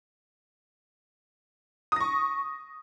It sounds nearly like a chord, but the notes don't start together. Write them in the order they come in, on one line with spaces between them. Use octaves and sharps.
D#6 A#6 C#6